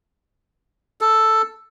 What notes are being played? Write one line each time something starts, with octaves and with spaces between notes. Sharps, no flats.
A4